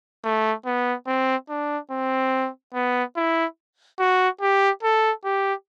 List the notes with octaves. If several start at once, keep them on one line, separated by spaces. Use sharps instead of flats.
A3
B3
C4
D4
C4
B3
E4
F#4
G4
A4
G4